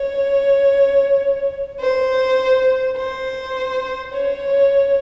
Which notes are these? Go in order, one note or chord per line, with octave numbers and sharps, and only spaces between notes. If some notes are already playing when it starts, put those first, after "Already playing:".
Already playing: C#5
C5
C5
C#5